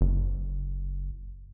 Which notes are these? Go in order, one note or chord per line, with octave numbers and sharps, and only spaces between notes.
F#1